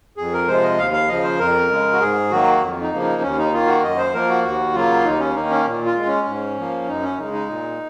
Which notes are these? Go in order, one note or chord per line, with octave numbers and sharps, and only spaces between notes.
F2 G#4
A#4
C3 F3 G#3 C5
D#5
D#2 F5
F5
C#3 F3 D#5
C5
F2 A#4
C#3 G#3
F#4
G#2 G#4
D#3 F#3 A#3 F#4
F2
D#4
C#3 F3 A#3
D#4
D#2 C#4
D#4
D#3 A#3 F4
F#4
F#2 D#5
C5
F3 A#3 A#4
F#4
D#2 F#4
C#3 F#3 A#3 F4
D#2 D#4
C#4
D#3 A#3 D#4
C#4
A#2
F4
G#3
C#4
G#2
F3 A#3
F#2 D#4
C#4
C#3 G#3 D#4
D#4
A#2